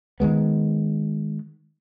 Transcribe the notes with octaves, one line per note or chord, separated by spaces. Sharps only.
D#3 F3 G#3 B3